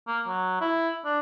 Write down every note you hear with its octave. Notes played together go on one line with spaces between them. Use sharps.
A#3
F#3
E4
D4